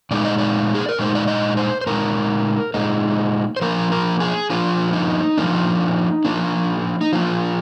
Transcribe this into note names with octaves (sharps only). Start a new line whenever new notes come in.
A#2 G#3 D#4 D5
D#5
D5
G#4
A#4
A#2 G#3 D#4 C5
D5
D#5
C5
C5
A#2 G#3 D#4 A#4
A#2 G#3 D#4
C5
F3 A#3 D4 A#4
A#4
G#4
F3 A#3 D4 F4
D#4
F3 A#3 D4
F3 A#3 D4
D#4
F3 A#3 D4 F4